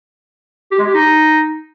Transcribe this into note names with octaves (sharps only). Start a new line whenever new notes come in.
G4
G#3
G4
D#4